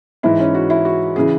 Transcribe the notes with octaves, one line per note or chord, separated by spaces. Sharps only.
G#2 E3 E4
C#4
F#4
E4
F#4
C#3 E3 G#4